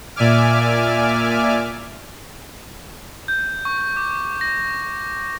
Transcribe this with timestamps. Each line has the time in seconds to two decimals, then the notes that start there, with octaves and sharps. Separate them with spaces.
0.16 A#2 D5 E5 G#5 D6 F6
3.28 G6
3.65 C#6
3.97 D6
4.41 A#6